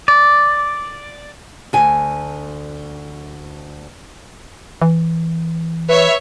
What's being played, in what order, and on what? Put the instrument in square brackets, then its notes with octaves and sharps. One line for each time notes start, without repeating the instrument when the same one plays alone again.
[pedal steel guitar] D5
[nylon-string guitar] D2 G#5
[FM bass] E3
[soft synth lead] B4 [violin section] C#5 E5